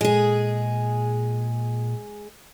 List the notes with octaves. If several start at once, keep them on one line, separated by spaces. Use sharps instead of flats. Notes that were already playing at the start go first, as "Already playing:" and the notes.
A#2 G#3 G#4